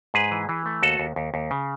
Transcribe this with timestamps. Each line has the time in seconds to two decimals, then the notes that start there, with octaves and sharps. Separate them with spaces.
0.14 G#2 G#4 B4
0.31 E3
0.49 E3
0.66 A3
0.82 D#2 F#4 A4
1.00 D#2
1.16 D#2
1.34 D#2
1.51 C#3